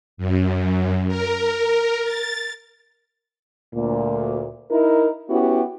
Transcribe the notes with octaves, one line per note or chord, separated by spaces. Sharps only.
F#2
A#4
A6
D2 A#2
D#4 E4 A#4
B3 C#4 E4 F#4 G4